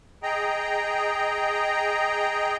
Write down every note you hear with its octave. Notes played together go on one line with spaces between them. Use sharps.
G#4 D#5 G5 A#5